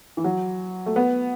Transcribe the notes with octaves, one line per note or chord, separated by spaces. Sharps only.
E3
F#3
A3
B3